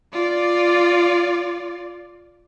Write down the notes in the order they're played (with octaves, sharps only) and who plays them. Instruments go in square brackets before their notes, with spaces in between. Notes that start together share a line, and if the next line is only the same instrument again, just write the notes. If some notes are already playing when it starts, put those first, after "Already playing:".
[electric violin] F4 D5